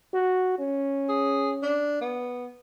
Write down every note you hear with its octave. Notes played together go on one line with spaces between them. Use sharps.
F#4
C#4
G#4
D4
B3